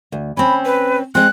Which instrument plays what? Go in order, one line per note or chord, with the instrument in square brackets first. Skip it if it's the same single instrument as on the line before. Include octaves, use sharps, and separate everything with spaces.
[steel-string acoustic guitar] D2
[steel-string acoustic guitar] C4 C#4 [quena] B5
[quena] B4
[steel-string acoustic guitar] G#3 C4 [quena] F#6